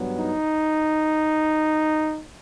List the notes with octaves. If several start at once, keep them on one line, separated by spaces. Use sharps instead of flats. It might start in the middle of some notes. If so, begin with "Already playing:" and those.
Already playing: G2 F#3 B3
D#4